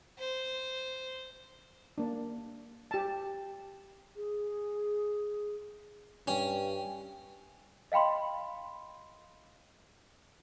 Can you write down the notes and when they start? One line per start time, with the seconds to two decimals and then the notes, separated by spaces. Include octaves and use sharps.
0.18 C5
1.98 A#3 D4
2.91 G4 A5
4.16 G#4
6.28 G2 C#4 G5
7.92 D#5 F5 G5 B5 C6